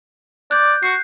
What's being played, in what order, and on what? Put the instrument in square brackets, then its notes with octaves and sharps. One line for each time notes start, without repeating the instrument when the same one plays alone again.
[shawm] D5 [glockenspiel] F#6 G6
[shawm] F#4 [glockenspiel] C7